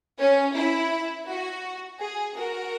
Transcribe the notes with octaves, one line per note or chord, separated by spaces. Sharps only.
C#4
E4
F#4
G#4
F#4 A#4